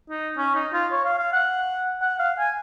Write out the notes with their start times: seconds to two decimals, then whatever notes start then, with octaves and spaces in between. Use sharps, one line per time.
0.10 D#4
0.38 C#4
0.55 D#4
0.73 F4
0.92 C#5
1.05 F5
1.19 F5
1.33 F#5
2.01 F#5
2.19 F5
2.38 G#5